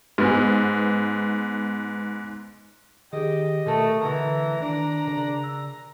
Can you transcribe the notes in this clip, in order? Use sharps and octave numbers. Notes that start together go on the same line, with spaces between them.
G#2 B3
D#3 G4 G#4 D#5
B2 A3 A4 A#4
D3 E3 F#5 A#5
D#3 D4
C#3 A#4 D5
E6